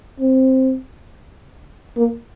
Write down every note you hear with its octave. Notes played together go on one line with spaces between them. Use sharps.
C4
A#3